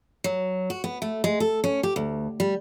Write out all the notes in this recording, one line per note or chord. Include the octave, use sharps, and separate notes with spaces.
F#3
F#4
B3
A3
G#3
A4
C#4
G4
D2
G3